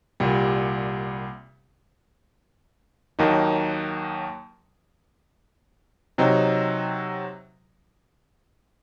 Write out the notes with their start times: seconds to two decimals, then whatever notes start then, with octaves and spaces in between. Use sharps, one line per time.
0.20 C2 A#2 G3
3.19 D#2 D#3 F#3 A#3 D#4
6.18 C3 F#3 C4 D#4